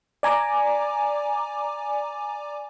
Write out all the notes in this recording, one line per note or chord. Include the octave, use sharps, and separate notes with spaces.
D5 G#5 A#5 D6